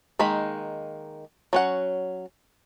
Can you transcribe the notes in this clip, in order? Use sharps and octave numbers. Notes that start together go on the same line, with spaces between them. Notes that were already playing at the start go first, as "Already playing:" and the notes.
D#3 G#3 A#3 D#4 B5
F#3 C#4 F#5